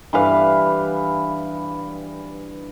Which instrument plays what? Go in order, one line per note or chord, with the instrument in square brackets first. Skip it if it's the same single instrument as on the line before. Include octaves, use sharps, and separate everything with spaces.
[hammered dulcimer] G2 E3 B4 F5